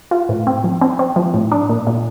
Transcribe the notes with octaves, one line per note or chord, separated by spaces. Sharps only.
F4
A2
C4
F3
C4
C4
F3
A2
D4
A#2
A#2